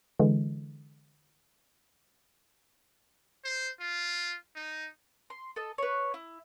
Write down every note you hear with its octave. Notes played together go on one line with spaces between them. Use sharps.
D3 E3 G#3
C5
F4
D#4
C6
A4 D#5
B4 C#5
E4